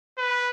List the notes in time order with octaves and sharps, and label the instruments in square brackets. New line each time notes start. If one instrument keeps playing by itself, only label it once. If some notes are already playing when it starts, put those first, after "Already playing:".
[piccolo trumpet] B4